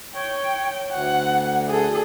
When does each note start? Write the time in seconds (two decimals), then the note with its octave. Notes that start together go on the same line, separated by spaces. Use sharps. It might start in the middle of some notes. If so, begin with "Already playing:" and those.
0.15 C#5 G5
0.91 D2 F#5
1.69 G#4 A4